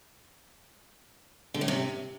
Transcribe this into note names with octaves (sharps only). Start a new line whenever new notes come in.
D3
A2
C3